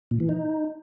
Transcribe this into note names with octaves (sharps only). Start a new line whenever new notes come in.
A#2
E3
D#4